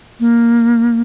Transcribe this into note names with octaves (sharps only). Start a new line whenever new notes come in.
A#3